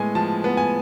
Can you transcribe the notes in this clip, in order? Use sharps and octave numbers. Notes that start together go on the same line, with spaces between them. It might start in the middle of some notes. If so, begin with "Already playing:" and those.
Already playing: A2 G#3 B3 G#5
F3 A5
B3
G#5